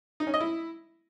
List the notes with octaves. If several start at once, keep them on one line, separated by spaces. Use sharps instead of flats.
D#4
C#4
D#5
E4